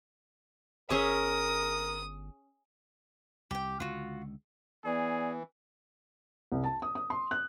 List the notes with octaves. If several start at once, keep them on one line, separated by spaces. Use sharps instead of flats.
G1 C#4 G#4 A#4 E5 D#6
C2 G4 G5
C#2 D3 F4 F#4
E3 B3 G#4 D5
C2
A5
D#6
D#6
C6
F#6